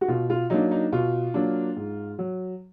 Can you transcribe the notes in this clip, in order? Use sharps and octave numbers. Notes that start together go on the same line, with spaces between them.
F#4
B2 F4
F4
F#3 A#3 D4 D#4
D#4
B2 F4
F#3 A#3 D4
G#2
F#3